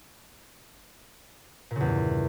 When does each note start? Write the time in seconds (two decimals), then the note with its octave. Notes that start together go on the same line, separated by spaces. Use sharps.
1.71 A#2
1.76 C#3
1.81 E2
1.85 G2